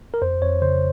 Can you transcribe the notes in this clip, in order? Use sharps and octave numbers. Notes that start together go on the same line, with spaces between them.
A#4
F2 C5
F2 C#5
C#3 C5